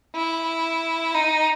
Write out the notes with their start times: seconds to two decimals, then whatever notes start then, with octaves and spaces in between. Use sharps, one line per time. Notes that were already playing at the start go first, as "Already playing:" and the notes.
0.15 E4
1.14 D#4